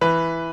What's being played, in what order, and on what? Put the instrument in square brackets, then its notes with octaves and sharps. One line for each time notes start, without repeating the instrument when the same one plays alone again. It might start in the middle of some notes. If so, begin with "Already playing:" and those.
[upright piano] E3 B4